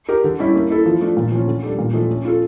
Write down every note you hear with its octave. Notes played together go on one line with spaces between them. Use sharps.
G4 A#4
D3
G3 C#4 E4 G4
A#3
E4 A4
F3
A3 D4 F4
A#2
F3 C#4
D3
G3 D4 A4
A#2
F3 A3 D4
C#4
F4 A4